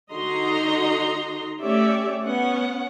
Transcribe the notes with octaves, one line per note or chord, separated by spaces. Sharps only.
D3 D#4 F#4 D#5 A#5 C6
A3 C#4 G4 C#5 D5 E5
B3 C#4 F#5